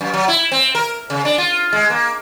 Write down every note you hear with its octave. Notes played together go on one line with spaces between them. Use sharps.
F#2
F#3
E4
C4
A#4
C#3
D4
F4
G#3
A#3